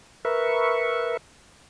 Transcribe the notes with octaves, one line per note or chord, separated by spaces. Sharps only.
A#4 B4 E5 C#6